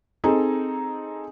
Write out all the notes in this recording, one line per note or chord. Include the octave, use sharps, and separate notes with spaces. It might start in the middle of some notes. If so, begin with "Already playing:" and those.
C4 D#4 G#4 A4